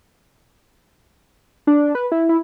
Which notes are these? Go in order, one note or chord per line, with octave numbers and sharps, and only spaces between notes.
D4
B4
E4
E4